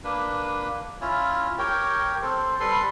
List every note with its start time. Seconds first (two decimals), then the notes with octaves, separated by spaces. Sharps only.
0.04 A#3 D4 B4
1.01 C#4 E4 F4
1.58 G4 A#4 C#5 G5
2.22 C4 A4 C5
2.60 G3 A4 B4 C6